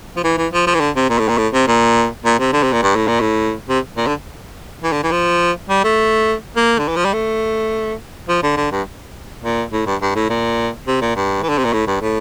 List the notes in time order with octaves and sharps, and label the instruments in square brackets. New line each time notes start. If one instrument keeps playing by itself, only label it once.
[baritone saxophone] F3
E3
E3
F3
F3
E3
D3
C3
A#2
A2
A#2
A2
C3
A#2
A#2
C3
D3
C3
A#2
G2
A2
A#2
A2
C3
A#2
D3
E3
D3
E3
F3
G3
A3
A#3
D3
E3
F3
G3
A3
F3
D3
D3
G2
A#2
A2
G2
G2
A2
A#2
C3
A#2
G2
E3
D3
C3
A#2
A2
G2
A2